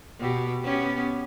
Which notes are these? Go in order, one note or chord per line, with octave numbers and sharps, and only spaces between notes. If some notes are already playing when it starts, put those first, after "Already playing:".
B2 G4
B3 C#4 G4